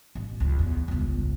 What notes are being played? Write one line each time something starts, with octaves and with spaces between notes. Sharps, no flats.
A1
C#2
E2
G1 C#2